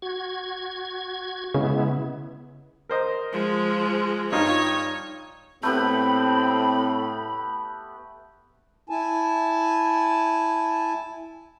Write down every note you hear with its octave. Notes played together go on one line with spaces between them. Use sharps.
F#4 G#6
C#3 G#3 B3 E4
A#4 C5 D#5
F3 G#3
G2 D#4 F4 C#5
A2 A3 B3 C4 G4 B5
E4 G#5 A5